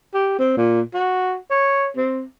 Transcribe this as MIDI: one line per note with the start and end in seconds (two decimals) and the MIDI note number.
0.14 0.35 67
0.39 0.53 60
0.57 0.81 46
0.94 1.37 66
1.51 1.87 73
1.97 2.23 60